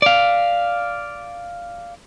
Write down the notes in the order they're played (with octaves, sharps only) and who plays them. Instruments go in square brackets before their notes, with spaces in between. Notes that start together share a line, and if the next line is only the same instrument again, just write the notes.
[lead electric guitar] D5 F5